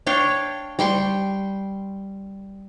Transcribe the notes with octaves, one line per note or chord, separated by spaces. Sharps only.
D4 C#5 F5 G5
G3 G5 C6 C#6